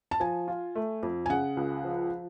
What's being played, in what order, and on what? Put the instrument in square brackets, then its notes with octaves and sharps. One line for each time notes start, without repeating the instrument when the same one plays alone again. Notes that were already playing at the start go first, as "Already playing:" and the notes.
[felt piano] A5
[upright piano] F3 [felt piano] G#5
[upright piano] F4
A3
F2
[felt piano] G#5
[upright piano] C#3 [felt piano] F#5
[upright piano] C#2
F3